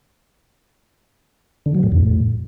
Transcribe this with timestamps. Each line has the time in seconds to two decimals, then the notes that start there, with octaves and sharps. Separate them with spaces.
1.66 D3
1.75 F#3
1.83 A2
1.92 F2
2.01 A2